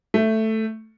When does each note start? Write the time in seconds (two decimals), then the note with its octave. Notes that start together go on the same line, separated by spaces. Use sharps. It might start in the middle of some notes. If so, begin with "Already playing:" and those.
0.14 A3